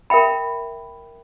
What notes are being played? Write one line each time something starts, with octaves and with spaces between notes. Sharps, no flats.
A#4 E5 G5 B5